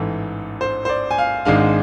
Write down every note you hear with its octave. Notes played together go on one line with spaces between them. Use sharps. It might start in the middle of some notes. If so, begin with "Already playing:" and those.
Already playing: A1 G#2 E3 A4
C5
C5
D5
G#5
F5
G#1 G#2 G#3 D4 F5